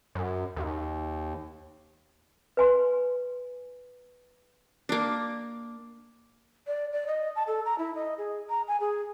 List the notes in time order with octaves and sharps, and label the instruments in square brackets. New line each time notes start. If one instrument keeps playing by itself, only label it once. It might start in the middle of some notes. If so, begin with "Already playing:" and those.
[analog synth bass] F#2
D#2
[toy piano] B4 G#5 C6
[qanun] A#3 D4
[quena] D5
D5
D#5
A5
A4
A#5
E4
D#5
G#4
A#5
G#5
G#4